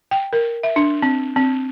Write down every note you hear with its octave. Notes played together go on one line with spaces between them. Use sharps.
G5
A#4
E5
D4
C4
C4